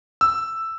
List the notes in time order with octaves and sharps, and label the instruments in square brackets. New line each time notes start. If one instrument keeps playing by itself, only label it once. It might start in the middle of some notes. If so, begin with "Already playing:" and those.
[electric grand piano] E6